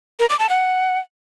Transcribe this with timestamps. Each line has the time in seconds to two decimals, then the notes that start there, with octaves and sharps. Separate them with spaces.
0.20 A#4
0.30 D6
0.39 A5
0.49 F#5